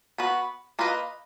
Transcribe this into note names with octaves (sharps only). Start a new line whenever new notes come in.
B3 F#4 B4
A#3 F4 B4 D#5